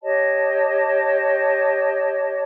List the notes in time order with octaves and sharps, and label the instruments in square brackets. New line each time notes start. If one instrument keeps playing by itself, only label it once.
[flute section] G4 C#5 D#5 A5